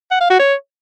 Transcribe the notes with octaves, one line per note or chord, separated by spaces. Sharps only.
F#5
F5
F#4
C#5